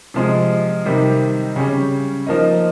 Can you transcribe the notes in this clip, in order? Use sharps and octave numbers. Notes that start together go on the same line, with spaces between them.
C3 F3 G#3
C3 D#3 G3
C#3 G3 C#4
F3 A#3 D#4